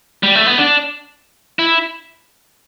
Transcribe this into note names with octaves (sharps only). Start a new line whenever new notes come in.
G3
A3
B3
D4
E4